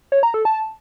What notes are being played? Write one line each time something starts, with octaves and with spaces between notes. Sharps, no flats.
C#5
A#5
A4
A5